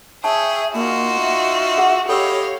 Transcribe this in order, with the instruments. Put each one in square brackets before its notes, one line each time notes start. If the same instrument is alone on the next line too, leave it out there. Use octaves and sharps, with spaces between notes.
[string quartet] G#4 [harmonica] C#5 G5 [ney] E5 [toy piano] A5
[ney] A#3 [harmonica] D#4 F4 [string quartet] F#4
[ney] E5
[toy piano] G#4 F#5
[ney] G4 [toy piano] A4 E6 [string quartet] C#5 F5 [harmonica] D#5 G5 B5